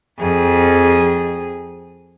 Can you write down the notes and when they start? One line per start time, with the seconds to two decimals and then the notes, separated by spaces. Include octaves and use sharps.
0.19 F2 G#4